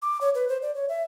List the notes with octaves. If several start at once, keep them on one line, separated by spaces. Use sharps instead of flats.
D6
C#5
B4
C5
D5
C#5
E5